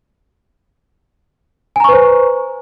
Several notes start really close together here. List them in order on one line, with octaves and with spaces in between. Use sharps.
G#5 A#5 C#6 B4 C5